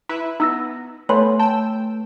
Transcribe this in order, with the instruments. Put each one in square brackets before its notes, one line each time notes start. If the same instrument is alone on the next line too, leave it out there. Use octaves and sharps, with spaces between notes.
[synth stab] E4 B4 E5 [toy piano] B5
[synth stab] B3 [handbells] D#4 E6 A#6
[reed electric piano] A3 [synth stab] B3 [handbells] B4 G#5 B5 [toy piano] C#5 C6
[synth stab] G5 E6 [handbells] A5